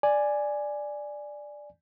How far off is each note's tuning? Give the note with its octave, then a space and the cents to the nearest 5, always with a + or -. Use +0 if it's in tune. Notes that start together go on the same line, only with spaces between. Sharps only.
D5 +5 G#5 +0